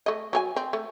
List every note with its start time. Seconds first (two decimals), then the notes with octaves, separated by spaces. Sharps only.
0.06 A3 D#5
0.33 F#3 G#4 G#5
0.56 C4
0.73 A3